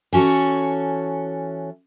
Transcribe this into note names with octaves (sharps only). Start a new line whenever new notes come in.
E3 C#4 F#4 A4 C#5